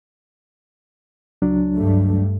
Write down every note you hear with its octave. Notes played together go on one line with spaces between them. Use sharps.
C#2 F#3 D4
G2 G3 A3